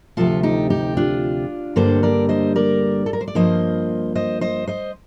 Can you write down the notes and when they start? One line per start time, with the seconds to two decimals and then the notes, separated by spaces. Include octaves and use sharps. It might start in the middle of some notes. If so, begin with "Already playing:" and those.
0.17 D2 C3 F3 F4 A4
0.43 D#4 G4
0.70 D#4 G4
0.97 D4 F4
1.76 G2 D3 G3 A#3 A4 C5
2.03 A#4 D5
2.29 C5 D#5
2.56 A#4 D5
3.06 A4
3.13 A#4
3.21 C5
3.28 D5
3.35 G2 F3 A#3 C5 D#5
4.15 C5 D#5
4.41 C5 D#5
4.67 C5 D#5